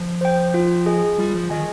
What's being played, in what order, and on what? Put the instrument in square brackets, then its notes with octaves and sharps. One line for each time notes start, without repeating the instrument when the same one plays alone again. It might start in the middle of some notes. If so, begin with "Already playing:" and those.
Already playing: [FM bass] F3
[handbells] C5 G5
F4
G#4 D#5 G#5
[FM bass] G3 [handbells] F4
[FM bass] F3
[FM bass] D#3 [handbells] G#4 D#5 G#5